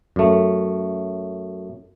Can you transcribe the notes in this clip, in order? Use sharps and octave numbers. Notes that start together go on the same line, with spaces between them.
F#2 A3